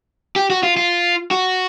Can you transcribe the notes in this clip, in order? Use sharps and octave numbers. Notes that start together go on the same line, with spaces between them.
G4
F#4
F4
F4
F#4